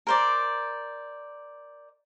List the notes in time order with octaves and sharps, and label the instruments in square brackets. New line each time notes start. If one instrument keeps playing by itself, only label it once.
[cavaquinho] A#4 C5 D5